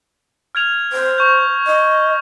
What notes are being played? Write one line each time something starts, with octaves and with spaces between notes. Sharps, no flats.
F6 G#6 F7
C5
C#6 G6
D#5